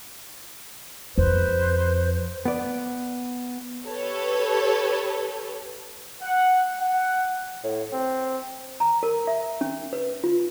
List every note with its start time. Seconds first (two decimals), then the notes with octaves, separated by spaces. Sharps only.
1.18 F2 B4 C5
2.45 B3 D5
3.86 G4 A4 B4 C#5
6.22 F#5
6.79 F#5
7.64 A2
7.93 C4
8.80 A#5
9.03 A#4
9.27 E5
9.61 C#4
9.93 B4
10.24 F4